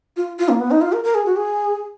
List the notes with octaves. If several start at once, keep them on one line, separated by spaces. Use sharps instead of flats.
F4
F4
A#3
B3
D#4
F4
A#4
A#4
G#4
F#4
G#4